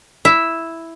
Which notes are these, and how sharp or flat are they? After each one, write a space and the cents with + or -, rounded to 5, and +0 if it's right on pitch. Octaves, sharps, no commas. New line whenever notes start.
E4 +0 E5 +0